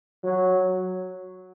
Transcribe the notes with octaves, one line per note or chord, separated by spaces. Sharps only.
F#3